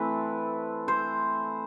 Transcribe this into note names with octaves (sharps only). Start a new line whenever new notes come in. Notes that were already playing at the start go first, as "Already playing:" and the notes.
Already playing: E3 A3 C4 B4
C5